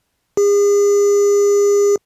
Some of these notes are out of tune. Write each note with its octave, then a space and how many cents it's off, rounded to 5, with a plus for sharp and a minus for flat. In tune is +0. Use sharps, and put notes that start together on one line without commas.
G#4 -40